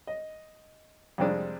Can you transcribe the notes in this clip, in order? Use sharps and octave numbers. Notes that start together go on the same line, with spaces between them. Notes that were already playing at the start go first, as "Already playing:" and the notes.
D#5
F2 C3 G3 G#3 C4 D4